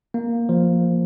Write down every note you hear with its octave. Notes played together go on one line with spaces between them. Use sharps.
A#3
F3